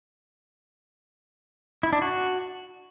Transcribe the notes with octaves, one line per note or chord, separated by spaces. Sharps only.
E4
D4
F#4